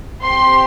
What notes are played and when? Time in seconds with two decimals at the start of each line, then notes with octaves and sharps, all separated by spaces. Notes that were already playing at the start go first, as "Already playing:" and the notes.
0.24 C4 G4 C6